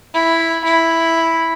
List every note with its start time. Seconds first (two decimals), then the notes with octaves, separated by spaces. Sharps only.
0.14 E4
0.64 E4